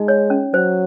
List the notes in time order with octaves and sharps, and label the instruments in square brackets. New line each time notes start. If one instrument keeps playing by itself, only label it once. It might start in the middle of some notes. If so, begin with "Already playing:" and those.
Already playing: [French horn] G#3 [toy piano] D#4
[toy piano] C#5
C#4
[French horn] F#3 [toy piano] C5